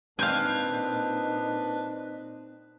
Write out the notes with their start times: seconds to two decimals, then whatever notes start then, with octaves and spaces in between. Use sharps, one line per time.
0.19 A#2 C4 D4 D#4 B4 F5 G#5 G6